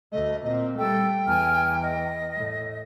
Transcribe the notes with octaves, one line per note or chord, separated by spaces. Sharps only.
D2 A3 D#5
A#2 C4 D#5
G3 A3 A4 G5 E6
E2 G#5 F6
D#5
A2